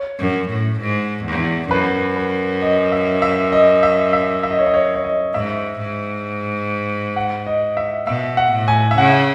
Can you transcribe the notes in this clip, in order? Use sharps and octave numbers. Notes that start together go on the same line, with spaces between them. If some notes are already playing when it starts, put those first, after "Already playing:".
Already playing: C#5
F#2
A2
G#2
E2
F#2 B4
B4
D#5
E5
E5
D#5
E5
E5
E5
D#5
C#5
D#5
C#5
C#5
D#5
G#2 E5
G#2
F#5
D#5
E5
B2 E5
F#5
A2
G#5
E5
C#3 F#5